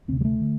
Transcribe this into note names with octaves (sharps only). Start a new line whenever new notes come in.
D2 C3 C4
G3
A3
D3